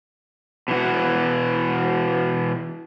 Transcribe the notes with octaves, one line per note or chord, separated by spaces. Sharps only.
B2 E3 F#4